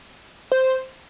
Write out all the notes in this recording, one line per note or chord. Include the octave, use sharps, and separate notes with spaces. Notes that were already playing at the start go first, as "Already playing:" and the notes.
C5